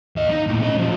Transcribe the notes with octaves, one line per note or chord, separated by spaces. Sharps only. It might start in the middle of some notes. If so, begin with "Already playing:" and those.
D#2 D#5
D#4
A#2 A3
C#4 D#5
F3 F#3